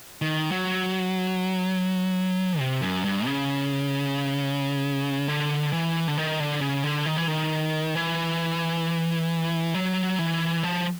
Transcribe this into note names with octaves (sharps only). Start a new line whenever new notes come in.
D#3
F#3
C3
F#2
G2
C#3
D3
E3
D3
D#3
D3
C#3
D3
D#3
E3
D#3
E3
F#3
E3
F3